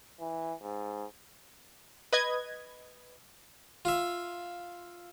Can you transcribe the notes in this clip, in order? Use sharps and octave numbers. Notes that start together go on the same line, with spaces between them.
E3
G#2
B4 D#5 G#6
F4 E5